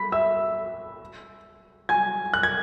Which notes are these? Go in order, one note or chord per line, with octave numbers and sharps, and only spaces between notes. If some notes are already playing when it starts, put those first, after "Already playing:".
Already playing: B5 B6
E5 E6
G#5 G#6
F#6
G#6